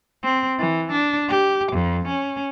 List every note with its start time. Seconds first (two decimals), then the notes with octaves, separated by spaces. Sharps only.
0.23 C4
0.59 E3
0.92 D4
1.29 G4
1.72 F2
2.08 C#4